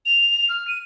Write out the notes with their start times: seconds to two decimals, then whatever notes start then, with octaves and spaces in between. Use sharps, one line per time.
0.06 F7
0.49 F6
0.68 D#7